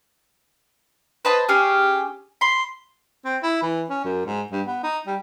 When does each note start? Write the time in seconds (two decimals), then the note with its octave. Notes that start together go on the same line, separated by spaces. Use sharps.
1.25 B4 C5 D#5 A5
1.49 C#4 G4 G#4
2.41 B5 C6
3.25 C4
3.43 E4
3.62 E3
3.89 C#4
4.05 F#2
4.26 G#2
4.52 G2
4.67 B3
4.83 D#4
5.07 G3